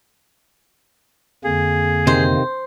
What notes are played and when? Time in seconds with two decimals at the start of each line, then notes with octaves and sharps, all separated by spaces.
1.44 F2 D3 A#3 G#4
2.07 C3 D#3 C5